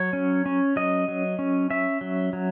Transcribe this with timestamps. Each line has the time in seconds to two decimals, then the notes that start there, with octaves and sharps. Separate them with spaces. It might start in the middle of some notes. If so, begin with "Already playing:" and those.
Already playing: F#3 C#5
0.13 C#4
0.46 C#4
0.76 F#3 D#5
1.08 F#3
1.39 C#4
1.70 C#4 E5
2.01 F#3
2.33 F#3